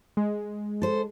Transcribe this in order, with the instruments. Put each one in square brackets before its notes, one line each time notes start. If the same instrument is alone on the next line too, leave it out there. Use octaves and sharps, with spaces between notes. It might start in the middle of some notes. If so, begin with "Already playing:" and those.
[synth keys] G#3
[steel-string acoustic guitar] A4 C5